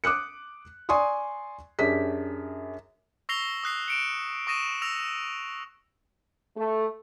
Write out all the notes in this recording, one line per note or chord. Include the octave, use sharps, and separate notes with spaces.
D6 D#6 F#6 C#7
D5 G#5 C6 C#6 D#6
F#2 D4 G4 G#4 B6
C#6 E6 A#6 C7 F7 G7
D#6 F#6 C7
C#7 D7 E7
C#6 D#6 A#6 D#7 E7
E6 A#6 F7
A3